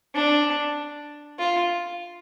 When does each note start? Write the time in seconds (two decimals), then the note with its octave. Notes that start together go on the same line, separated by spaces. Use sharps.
0.15 D4
1.39 F4